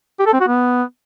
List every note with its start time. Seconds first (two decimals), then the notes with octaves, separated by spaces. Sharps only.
0.19 G4
0.26 A4
0.33 C4
0.40 F#4
0.47 B3